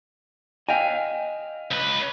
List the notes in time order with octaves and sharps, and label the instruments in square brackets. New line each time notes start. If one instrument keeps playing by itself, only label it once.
[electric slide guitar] D#5 F5 [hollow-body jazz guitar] G5 G#5
[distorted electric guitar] C#2 B4